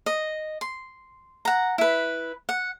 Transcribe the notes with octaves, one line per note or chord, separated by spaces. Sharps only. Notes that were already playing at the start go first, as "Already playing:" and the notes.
D#5
C6
F#5 A#5
E4 B4
F#5